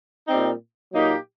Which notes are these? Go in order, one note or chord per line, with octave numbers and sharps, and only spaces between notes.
A#2 G3 C4 D#4
A#2 F#3 A#3 D#4 G4